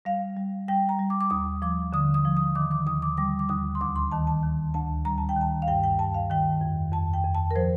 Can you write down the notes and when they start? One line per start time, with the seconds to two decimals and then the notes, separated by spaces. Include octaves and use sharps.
0.05 G3 F5
0.36 G3
0.68 G3 G5
0.89 A#5
0.99 G3
1.10 D6
1.21 D6
1.30 D#2 D#6
1.62 F3 D6
1.93 D3 D#6
2.14 D#6
2.25 F3
2.37 D#6
2.55 D#3 D6
2.71 D6
2.87 D#2 D#6
3.02 D6
3.17 G3 D6
3.39 D6
3.49 D#2 D#6
3.75 C6
3.81 D2 D6
3.96 C6
4.11 D#3 A5
4.27 A5
4.43 D#3
4.74 D2 A5
5.05 G3 A#5
5.18 A5
5.29 G5
5.36 D#3 A5
5.62 F5
5.67 G2 G5
5.84 G5
5.99 G2 A5
6.14 F5
6.30 D#3 G5
6.61 F2
6.93 F2 A5
7.14 G5
7.24 F2
7.35 A5
7.51 A#4
7.56 F3 C5